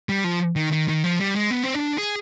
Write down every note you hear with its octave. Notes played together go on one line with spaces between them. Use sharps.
G3
F3
D#3
D#3
D#3
F3
G3
G#3
B3
C4
D4
G#4